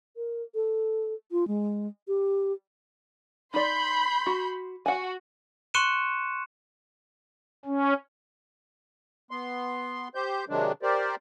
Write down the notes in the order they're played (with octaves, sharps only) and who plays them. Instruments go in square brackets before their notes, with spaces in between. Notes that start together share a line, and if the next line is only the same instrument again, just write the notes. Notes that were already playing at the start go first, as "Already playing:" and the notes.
[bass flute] A#4
A4
F4
G#3
G4
[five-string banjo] D#4 D5 [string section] B5 C6 G6
[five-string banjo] F#4
[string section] F#4 [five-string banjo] F#5 G#5
[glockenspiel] C6 C#6 F#6 C#7 D#7 E7
[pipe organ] C#4
[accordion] B3 C6
G4 C5 G6
C3 D#3 F#3 G#3 D4
G4 A#4 C5 D5